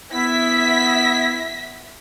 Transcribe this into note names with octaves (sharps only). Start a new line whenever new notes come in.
B3 E4 E5 B6